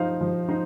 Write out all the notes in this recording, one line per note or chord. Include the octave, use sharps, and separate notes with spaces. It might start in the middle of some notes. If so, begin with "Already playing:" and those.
Already playing: F3 D#4 C5 F5
F3
D#4 C5